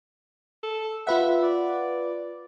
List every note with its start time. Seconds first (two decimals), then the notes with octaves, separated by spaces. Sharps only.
0.63 A4
1.07 F4 B4 E5 F#5
1.43 D5